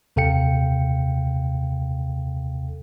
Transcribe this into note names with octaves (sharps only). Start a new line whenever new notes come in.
D#2 C3 A4 F5 G5 C#7